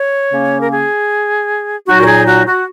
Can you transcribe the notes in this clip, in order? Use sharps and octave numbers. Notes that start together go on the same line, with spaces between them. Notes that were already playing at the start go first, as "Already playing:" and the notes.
Already playing: C#5
C#3 A#3 C#4
A#4
G#4
A#2 F#3 D#4 F#4
A#4
G#4
F#4
F#4